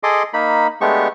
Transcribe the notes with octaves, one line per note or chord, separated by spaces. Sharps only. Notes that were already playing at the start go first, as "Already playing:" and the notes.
G#4 A4 D#5 C6 D6
A#3 D#4 B5
G#3 A3 B3 D4 G4 C#6